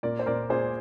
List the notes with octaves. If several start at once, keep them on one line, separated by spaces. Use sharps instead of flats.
A#2 A#4 D5
C5
A#2 A#4 D5
A#2 G#4 C5